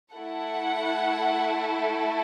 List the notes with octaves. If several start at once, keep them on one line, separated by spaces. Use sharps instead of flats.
A3 E4 A4 F#5